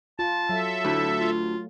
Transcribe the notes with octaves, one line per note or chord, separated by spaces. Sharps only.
F4 A5
F#3 A4 E5
D2 A3 E4
F4